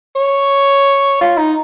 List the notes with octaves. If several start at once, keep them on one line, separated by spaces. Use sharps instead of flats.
C#5
F4
D#4